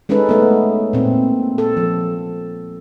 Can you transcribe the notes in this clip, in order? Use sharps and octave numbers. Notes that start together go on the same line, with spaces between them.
G#3 C#4 D#4 A4 B4
A3 B3
A#2 C4
A4
F3